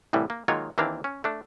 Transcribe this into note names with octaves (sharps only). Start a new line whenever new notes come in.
C2 A2 E3 G3
A#3
D#3 F#3 G#3 A#3 F4 C#5
D#2 E3 A#3 C4 D4 F5
C#4
A3 D4